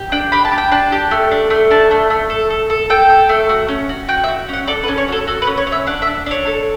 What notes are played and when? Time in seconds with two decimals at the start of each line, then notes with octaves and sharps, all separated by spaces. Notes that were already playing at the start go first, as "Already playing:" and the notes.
Already playing: G4
0.12 D4 G5
0.32 G4 B5
0.45 A5
0.52 G4
0.58 G5
0.72 D4 A5
0.92 G4
1.11 A3
1.31 D4
1.50 A3
1.71 D4 A5
1.91 A3
2.10 A3
2.30 A4
2.50 A4
2.70 A4
2.90 A4 G5
3.10 A4
3.29 A3
3.49 F#4
3.68 C#4
3.89 F#4
4.08 F#4 G5
4.24 E5
4.28 F#4
4.49 C#4 F#5
4.67 A4 D5
4.83 B4
4.88 C#4
4.98 C#5
5.08 F#4 A4
5.27 F#4 A4
5.42 B4
5.47 C#4
5.57 C#5
5.67 C#4
5.72 E5
5.87 D4 F#5
6.02 E5
6.07 D4
6.26 D4 C#5
6.47 A4